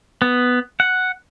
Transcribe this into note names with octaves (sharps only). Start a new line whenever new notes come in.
B3
F#5